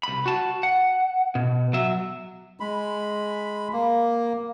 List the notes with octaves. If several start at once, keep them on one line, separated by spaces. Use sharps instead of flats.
C2 B5
F#4 A5
F#5
B2
F#3 E5
G#3 B5
A#3